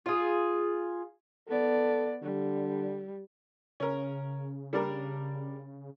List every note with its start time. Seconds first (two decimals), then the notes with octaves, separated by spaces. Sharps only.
0.06 F4 G#4
1.48 B3 A4 D5
2.22 D3 G3
3.80 C#3 C#4 A#4
4.73 G3 D4 A#4